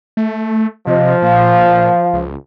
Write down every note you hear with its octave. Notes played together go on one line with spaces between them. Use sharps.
A3
C3 F3 D#5
A#2 F5
C#2